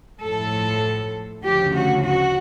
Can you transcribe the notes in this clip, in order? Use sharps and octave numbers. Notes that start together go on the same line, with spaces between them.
A2 F3 A4
D2 C#3 F3 G4
F#4
F#4